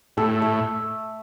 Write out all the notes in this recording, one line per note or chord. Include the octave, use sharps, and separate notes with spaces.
A2 A4
A3